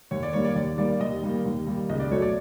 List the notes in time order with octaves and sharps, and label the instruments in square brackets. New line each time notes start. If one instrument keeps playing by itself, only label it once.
[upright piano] D#2 C#5
D5
D#3 G3 A#3 C#5
D5
D#2 D5
D#3 G3 A#3 D5
D#2 D#5
D#3 G3 A#3
D#2
D#3 G3 A#3
C#2 D#5
D5
B2 F#3 A3 C#5
D5